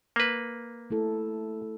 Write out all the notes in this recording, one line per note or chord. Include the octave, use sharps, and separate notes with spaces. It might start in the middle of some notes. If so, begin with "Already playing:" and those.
A#3 B4
A3 E4 A4